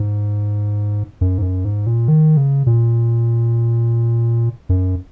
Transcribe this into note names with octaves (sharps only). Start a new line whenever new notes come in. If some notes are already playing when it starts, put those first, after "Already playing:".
Already playing: G#2
F#2
G#2
F#2
G#2
A#2
D#3
C#3
A#2
F#2